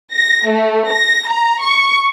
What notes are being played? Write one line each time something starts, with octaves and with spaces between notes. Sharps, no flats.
A#6
A3
A#6
A#5
C#6